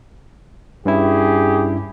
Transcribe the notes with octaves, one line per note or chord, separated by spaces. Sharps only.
G2 C#4 E4 G4 G#4